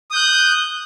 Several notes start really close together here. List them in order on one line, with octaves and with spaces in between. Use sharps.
D#6 G6 F#6